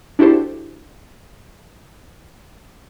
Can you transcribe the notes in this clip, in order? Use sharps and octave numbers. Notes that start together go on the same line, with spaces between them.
D4 E4 F#4 G4 A4 C5